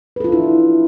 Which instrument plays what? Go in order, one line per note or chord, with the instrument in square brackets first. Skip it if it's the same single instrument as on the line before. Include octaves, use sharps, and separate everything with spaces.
[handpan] B4
A4
F4
D4
E4